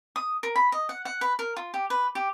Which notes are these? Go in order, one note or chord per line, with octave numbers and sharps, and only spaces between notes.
D#6
A#4
B5
D#5
F#5
F#5
B4
A#4
F4
G4
B4
G4